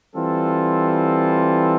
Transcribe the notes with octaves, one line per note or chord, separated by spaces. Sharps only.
E3 G3 C4 F4 A4